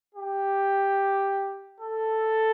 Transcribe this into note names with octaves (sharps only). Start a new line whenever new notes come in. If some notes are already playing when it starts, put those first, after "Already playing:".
G4
A4